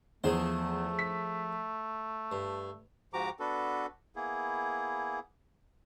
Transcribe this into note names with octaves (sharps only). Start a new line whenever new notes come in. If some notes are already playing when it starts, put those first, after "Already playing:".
E2 F3 A3 G#4 C5
B6
G2
G#2 F3 F#4 G4 A#5 D6
B3 D4 F#4 A4 B4
A#3 B3 E4 G#4